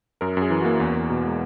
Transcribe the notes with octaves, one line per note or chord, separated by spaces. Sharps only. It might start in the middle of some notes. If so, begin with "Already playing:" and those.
F#2 A#4
F#2 G#4
E3
A#3 F#4
E2
E2
B2
G#3